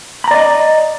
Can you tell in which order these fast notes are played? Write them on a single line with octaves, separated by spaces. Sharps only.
B5 A#5 D5 D#5